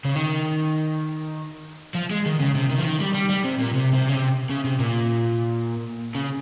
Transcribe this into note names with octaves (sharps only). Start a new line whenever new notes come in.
C#3
D#3
F3
G#3
D#3
C#3
C3
D#3
F3
D#3
G3
G3
G3
C3
A#2
C3
C3
C#3
C3
C#3
C3
A#2
C#3